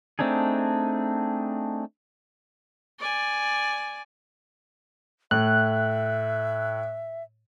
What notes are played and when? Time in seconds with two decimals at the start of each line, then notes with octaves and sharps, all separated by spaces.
0.19 A3 C4 D4 D#4 G#4
2.99 D5 G#5
5.31 A2 E5 F#6